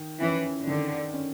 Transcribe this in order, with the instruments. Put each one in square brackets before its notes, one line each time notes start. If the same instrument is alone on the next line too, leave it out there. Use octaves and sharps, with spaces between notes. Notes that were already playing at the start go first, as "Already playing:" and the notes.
Already playing: [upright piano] D#3
[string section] E3 [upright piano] C#4
[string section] D3 [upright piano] D#3
[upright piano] C#4